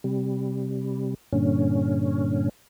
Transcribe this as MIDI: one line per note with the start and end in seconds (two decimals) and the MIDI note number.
0.04 1.14 48
0.04 1.14 55
1.33 2.49 43
1.33 2.49 46
1.33 2.49 50
1.33 2.49 61